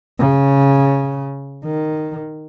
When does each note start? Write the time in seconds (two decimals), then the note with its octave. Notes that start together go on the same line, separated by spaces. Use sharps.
0.19 C#3
1.65 D#3